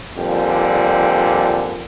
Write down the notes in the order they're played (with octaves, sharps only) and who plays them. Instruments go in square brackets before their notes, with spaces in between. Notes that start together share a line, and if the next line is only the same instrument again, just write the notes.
[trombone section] F2 A#2 D3 G3